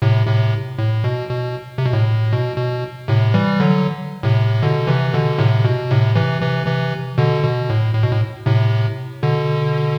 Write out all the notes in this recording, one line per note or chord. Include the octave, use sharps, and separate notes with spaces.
A2 C3
A2 C3
A2
B2
B2
C3
B2
A2
B2
B2
A2 C3
E3 G3
D3 F#3
A2 C3
B2 D3
C3 E3
B2 D3
A2 C3
B2
A2 C3
C3 E3
C3 E3
C3 E3
B2 D3
B2
A2
A2
B2
A2
A2 C3
B2 D3